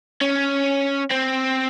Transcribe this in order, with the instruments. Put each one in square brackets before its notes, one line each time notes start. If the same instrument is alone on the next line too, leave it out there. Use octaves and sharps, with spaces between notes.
[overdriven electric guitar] C#4
C4